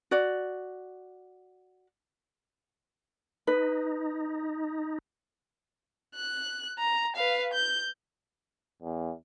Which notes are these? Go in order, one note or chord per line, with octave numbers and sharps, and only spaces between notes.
F#4 D5
D#4 B4
F#6
A#5
B4 F5
G6
E2